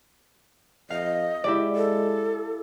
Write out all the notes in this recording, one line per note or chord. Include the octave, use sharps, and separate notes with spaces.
F2 D#5 F5
G#3 E4 G4 D5
A4